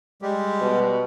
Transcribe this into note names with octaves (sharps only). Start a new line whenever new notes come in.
G3 G#3 G4
B2